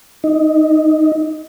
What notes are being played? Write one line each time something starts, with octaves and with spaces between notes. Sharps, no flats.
D#4